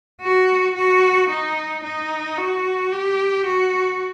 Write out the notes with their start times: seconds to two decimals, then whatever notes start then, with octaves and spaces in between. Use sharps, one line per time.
0.21 F#4
0.75 F#4
1.29 D#4
1.84 D#4
2.38 F#4
2.92 G4
3.46 F#4